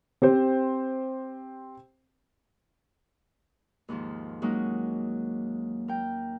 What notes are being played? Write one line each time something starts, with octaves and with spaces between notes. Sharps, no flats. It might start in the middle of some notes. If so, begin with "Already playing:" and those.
C4 G4 C5
D#2 G#2 D#3 F3
F#3 G#3 A#3 C#4 D#4
A#4 G5